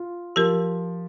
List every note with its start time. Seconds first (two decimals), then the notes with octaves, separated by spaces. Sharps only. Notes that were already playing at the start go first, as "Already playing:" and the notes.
Already playing: F4
0.36 F3 G4 A#4